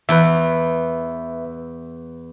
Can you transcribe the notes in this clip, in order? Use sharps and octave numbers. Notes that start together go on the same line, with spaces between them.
E2 B4 E5